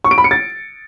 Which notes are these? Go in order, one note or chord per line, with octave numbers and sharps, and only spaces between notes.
C#6
D7
B5
C#7
A6